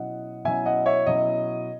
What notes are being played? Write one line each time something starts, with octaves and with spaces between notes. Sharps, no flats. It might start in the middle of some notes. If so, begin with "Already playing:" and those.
Already playing: B2 F#3 C#4 E4 D#5 F#5
B2 F#3 C#4 E4 E5 G#5
D#5 F#5
C#5 E5
B2 F#3 C#4 E4 D#5